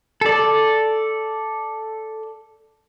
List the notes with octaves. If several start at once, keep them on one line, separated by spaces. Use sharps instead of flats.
A4 D5